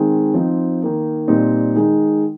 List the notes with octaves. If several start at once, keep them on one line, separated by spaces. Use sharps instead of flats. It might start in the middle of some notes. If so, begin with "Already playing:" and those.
Already playing: D#3 G#3 C4
F3 C4 D#4
D#3 A#3 D#4
A#2 G3 C4 D#4
D#3 G#3 D#4